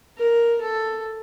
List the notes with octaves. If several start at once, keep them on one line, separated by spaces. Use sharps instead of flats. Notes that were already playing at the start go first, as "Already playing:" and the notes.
A#4
A4